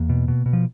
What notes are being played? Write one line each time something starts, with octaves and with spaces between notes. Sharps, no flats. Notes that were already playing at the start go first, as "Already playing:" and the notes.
Already playing: E2 A#3
B2
B2
B2
F3